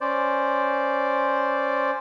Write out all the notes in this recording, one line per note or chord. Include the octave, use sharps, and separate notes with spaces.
C#4 C5 D5